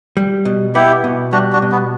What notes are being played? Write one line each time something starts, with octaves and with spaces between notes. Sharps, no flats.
G3
B2
B3 E4 G4
B2
G3 D4 F#4
D4 F#4
B2
B3